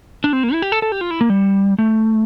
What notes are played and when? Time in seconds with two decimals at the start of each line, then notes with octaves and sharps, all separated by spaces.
0.24 D4
0.33 C4
0.43 A#3
0.53 E4
0.62 G4
0.72 A4
0.82 A4
0.92 G4
1.01 F4
1.11 E4
1.21 A#3
1.30 G3
1.79 A3